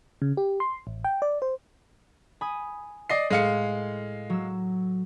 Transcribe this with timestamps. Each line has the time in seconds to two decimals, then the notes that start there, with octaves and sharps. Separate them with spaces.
0.22 C#3
0.37 G4
0.60 C6
0.87 A1
1.04 G5
1.22 D5
1.42 C5
2.41 G#5 B5 D#6
3.10 D5 D#5 C7
3.30 A2 G#3 F5 C#7
4.30 F#3 E6